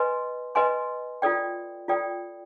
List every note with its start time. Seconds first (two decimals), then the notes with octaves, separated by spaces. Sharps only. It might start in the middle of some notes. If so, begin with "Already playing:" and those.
Already playing: B4 D#5 G#5 C6
0.55 B4 D#5 G#5 C6
1.22 F4 A4 D5 G5
1.88 F4 A4 D5 G5